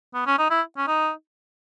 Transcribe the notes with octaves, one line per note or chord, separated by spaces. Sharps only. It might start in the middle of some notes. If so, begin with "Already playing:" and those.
B3
C#4
D#4
E4
C#4
D#4